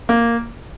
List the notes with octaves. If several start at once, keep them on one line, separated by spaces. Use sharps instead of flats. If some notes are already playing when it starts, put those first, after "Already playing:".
A#3